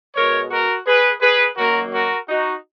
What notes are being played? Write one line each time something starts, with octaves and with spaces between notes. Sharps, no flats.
B2 G#3 A#4 C#5
F#4 A#4
G#4 B4
G#4 B4
F#2 D#3 F#3 A#3 F#4 A#4
F#4 A#4
D#4 F#4